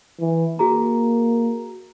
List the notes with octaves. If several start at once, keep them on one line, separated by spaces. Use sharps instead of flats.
E3
A#3 F#4 G#4 A#5